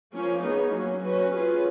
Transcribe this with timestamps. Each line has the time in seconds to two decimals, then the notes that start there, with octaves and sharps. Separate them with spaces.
0.14 F3 A#3 C#4
0.43 B3 D#4 G#4 C#5
0.73 F#3 A#3 C#4
1.03 C#4 F#4 B4
1.32 C#4 F4 G#4 B4